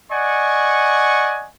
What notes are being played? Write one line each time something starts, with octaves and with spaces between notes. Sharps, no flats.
D5 D#5 F#5 G#5 C#6